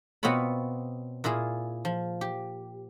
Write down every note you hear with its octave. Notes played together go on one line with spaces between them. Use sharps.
B2 B3 C4 F4 C#5 B5
A#2 E4 F4 G#4
F3
G4